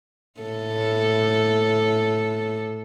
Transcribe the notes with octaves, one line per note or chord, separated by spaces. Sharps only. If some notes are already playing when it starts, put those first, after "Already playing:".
A2 A4